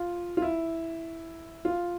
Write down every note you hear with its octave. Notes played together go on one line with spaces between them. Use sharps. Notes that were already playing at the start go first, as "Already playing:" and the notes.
Already playing: F4
F4
E4
F4